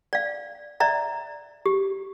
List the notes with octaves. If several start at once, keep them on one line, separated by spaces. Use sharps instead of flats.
D5 F5
D5 E5 A#5
G4